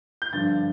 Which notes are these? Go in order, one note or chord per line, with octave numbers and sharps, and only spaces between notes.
G6
G2 D3 F3 A6